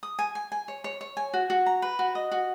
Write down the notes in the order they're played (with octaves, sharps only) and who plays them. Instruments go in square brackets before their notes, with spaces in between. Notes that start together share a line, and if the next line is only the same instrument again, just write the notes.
[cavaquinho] D#6
G#5
G#5
G#5
C#5
C#5
C#5
G#5
F#4
F#4
A#5
B4
F#4
D#5
F#4